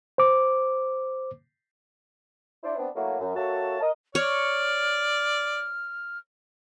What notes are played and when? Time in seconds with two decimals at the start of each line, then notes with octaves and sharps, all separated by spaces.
0.18 C5 D6
2.63 D4 E4 C5 D5
2.76 B3 C4 D4
2.95 F#3 A3 A#3 E4
3.20 F#2
3.36 A#3 F#4 A4 C#5 E5 A5
3.81 A#4 D#5
4.15 C#5 D5 F6